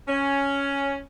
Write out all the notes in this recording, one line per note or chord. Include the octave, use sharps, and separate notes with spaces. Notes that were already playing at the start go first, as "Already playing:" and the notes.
C#4